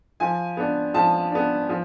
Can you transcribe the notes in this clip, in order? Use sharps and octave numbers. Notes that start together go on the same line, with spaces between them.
F3 G#5
B3 D4
F3 A5
B3 D4
F3